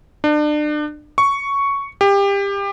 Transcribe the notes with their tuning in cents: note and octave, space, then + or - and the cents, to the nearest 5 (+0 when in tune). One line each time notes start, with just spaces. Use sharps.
D4 +35
C#6 +5
G4 +25